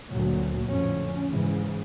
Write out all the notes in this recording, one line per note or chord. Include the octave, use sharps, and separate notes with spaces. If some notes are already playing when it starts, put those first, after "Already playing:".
G1 D2 A#2 D3 F#3
F2 A2 D3 C#4
G#2 C#3 E3